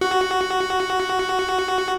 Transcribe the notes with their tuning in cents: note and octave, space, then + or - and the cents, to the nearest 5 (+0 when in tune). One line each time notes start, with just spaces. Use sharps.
F#4 +5